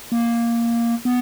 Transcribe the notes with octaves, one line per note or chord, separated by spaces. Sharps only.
A#3
B3